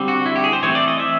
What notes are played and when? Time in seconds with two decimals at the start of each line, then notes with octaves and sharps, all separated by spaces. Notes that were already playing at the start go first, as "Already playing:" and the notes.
Already playing: D3 G3 C4
0.08 F#4
0.26 E4
0.36 G4
0.44 G#4
0.53 C5
0.63 E3 A3 C4 C#5
0.75 D5
0.88 D#5
1.00 E5